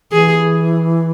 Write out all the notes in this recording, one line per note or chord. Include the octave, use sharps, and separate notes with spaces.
E3 G#4